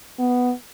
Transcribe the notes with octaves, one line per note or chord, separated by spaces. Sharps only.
B3